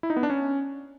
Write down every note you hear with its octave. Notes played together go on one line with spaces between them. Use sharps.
E4
D#4
B3
D4
C#4